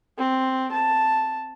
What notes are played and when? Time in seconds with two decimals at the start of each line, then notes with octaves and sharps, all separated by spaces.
0.18 C4
0.72 A5